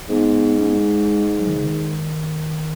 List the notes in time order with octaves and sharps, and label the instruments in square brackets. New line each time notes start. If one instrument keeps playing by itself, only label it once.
[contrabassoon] G#2 [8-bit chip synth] B3
[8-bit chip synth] C#4
B3
G#3
F#3
D#3
C#3
D#3